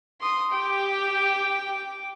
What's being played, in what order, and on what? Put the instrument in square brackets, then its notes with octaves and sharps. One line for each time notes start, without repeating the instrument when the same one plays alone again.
[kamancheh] C6 D#6
[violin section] G4 [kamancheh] G5 D6